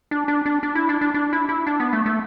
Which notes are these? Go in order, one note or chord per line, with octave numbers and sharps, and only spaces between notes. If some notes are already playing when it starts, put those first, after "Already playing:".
D4
D4
D4
D4
E4
D4
D4
D4
E4
E4
D4
B3
A3
A3